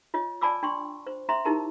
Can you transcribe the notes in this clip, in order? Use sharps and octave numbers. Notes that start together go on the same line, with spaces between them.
F4 C#5 D#5
D5 G#5 A5 B5 D6 E6
D4 G5 C6 C#6
C5
C#4 E5 A#5 C6
D#4 E4 G4 A#4 A5 A#5